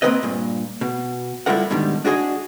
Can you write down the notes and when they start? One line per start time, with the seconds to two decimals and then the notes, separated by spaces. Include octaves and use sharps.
0.02 A#3 C4 F#4 A#4 B4 D#5
0.23 G2 A#2
0.81 B2
1.46 G3 E4 F4 A4 A#4 F#5
1.70 G#2 B2 D3 D#3 G3
2.05 D4 F#4 G#4 A#4 D#5